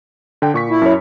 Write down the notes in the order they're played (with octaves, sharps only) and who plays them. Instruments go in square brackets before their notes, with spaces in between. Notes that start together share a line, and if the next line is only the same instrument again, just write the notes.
[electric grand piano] D3 G5
A#2 C#6 B6
[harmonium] E4
[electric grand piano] F#2 C#5